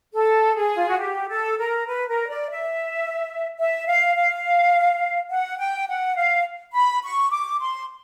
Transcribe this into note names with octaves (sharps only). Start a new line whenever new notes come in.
A4
G#4
F4
F#4
G4
A4
A#4
B4
A#4
D5
E5
E5
F5
F5
F#5
G5
F#5
F5
B5
C#6
D6
C6